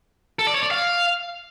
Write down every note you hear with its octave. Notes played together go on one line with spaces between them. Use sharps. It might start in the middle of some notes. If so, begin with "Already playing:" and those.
A4
D5
C#5
D5
F5